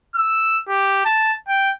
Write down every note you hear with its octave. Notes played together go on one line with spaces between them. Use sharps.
E6
G4
A5
G5